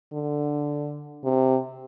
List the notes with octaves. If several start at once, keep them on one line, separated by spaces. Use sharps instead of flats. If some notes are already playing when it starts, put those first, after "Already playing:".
D3
C3